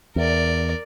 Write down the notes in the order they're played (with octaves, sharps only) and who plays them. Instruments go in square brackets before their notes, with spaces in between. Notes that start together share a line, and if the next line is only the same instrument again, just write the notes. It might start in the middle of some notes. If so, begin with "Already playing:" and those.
[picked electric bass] E2 [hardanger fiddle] A#4 D5